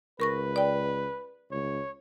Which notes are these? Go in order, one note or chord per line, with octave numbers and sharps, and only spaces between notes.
C#2 A#4 B4 C#6 A#6
D5 G5
C#2 C#5